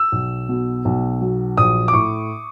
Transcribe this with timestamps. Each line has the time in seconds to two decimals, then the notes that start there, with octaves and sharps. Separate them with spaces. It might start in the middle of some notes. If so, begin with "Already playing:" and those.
Already playing: E6
0.12 B1
0.49 B2
0.85 B1
1.21 F#3
1.57 A#1 D#6
1.88 D6
1.93 A2 C#6